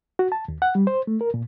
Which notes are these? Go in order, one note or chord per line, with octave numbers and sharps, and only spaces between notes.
F#4
A5
D#2
F#5
G3
C5
A3
A#4
A#2